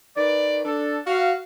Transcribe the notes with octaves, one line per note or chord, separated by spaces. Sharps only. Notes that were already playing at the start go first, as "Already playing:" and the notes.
D#3 B4 D5
D4 A4
F#4 F5